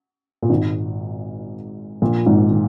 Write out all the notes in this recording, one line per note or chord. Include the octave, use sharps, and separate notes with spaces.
A#2
G#1 G#2
A#1 A#2
G#1 G#2
D#3